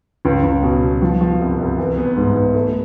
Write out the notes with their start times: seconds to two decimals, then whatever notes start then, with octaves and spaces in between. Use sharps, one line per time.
0.25 C#2
0.44 C#2
0.63 B2
0.82 B2
1.02 F3
1.21 F3
1.40 C2
1.59 C2
1.78 E3
1.97 B3
2.16 G#2
2.36 B3
2.55 A3